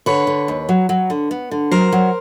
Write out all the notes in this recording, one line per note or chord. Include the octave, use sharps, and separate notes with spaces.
D3 B4 C#5
D3
D#2
F#3
F#3
D3
B3
D3
F#3 A#4 C5
F#3